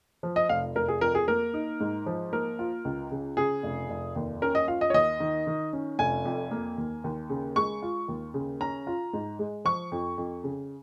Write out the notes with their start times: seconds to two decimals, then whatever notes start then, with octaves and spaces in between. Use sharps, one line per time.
0.23 F3
0.36 D#5
0.49 F1 F5
0.76 F1 A#4
0.88 G#4
1.01 F2 A#4
1.15 G#4
1.28 A#3 A#4
1.54 D#4
1.80 G#2
2.06 F3
2.33 A#3 A#4
2.59 F4
2.85 C#2
3.11 C#3
3.37 C#3 G#4
3.63 F1
3.90 F1
4.16 D#2
4.42 C#4 A#4
4.55 D#5
4.68 F4 F5
4.81 D#5
4.90 C#5
4.94 D#2 D#5
5.20 D#3
5.47 D#3
5.73 C#4
5.99 F1 G#5
6.25 F2
6.51 A#3
6.78 D#2
7.04 D#2
7.30 C#3
7.56 G#3 C#6
7.82 F4
8.08 D#2
8.34 C#3
8.61 C#4 A#5
8.87 F4
9.13 G#2
9.39 G#3
9.65 F3 C#6
9.92 F2
10.18 F2
10.44 C#3